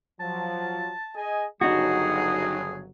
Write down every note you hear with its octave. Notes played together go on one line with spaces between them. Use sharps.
F3 F#3 A5
G#4 D#5 G#5
G1 C#3 F#3 D#4 F#4 G#4